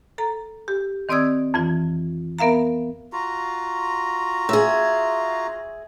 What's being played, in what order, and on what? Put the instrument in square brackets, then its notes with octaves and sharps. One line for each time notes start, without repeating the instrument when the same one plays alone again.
[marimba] A4 A#5
G4
D#3 C4 D5 D#6 E6 G#6
F2 E3 F4
B3 A#4 E5 F5 A#5
[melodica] F4 F#4 A#5
[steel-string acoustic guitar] G#4 E5